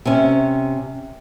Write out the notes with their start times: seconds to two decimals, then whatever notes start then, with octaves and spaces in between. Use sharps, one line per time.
0.05 C3 C#4